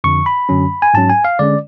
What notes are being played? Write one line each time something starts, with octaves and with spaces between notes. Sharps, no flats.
F2 D3 F3 C#6
B5
F#2 D3 F#3 C#4
G#5
G#2 F#3 C#4 A5
G#5
F5
D3 G#3 C#4 D5